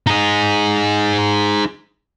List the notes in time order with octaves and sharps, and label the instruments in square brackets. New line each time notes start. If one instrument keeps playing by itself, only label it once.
[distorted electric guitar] D#4 G#4